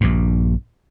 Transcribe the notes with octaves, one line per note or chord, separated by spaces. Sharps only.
A#1 G2